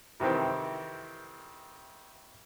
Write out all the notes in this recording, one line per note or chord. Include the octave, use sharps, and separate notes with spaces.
F2 C3 D#3 E3 C4